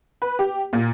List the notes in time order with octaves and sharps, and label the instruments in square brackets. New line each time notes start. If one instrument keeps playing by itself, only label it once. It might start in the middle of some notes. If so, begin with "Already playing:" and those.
[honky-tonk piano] B4
G4
A#2